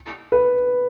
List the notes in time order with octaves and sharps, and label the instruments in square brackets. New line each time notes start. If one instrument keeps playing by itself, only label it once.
[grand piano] B4